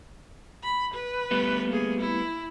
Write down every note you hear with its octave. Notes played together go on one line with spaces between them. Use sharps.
B5
B4
G3 A3 B3
A#3 G#4
E4